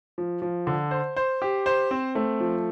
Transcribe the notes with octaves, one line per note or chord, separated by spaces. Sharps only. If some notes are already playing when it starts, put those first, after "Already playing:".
F3
F3
D3
C5
C5
G4
C5
C4
A3
F3